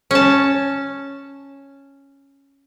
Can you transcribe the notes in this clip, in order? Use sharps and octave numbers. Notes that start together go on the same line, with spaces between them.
C#4 A5